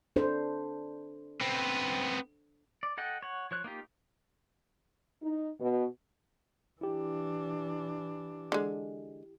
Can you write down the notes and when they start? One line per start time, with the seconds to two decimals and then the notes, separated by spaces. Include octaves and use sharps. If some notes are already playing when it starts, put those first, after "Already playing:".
0.16 D4 A4 C5
1.41 B3 C4
2.83 D5
2.98 A4 D#5 F#5 G5
3.22 C#5 F#5
3.51 F3 C#5 F#6
3.64 A#3 D#4 F4 G4
5.22 D#4
5.61 B2
6.81 E3 D4 E4 G4
8.52 D3 G#3